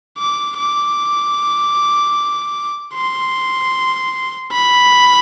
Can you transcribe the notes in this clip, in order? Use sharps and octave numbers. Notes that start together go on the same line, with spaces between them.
D6
D6
C6
B5